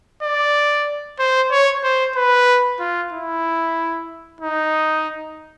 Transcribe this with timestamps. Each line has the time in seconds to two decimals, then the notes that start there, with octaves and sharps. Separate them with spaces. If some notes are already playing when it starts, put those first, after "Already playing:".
0.23 D5
1.19 C5
1.51 C#5
1.84 C5
2.16 B4
2.80 F4
3.13 E4
4.41 D#4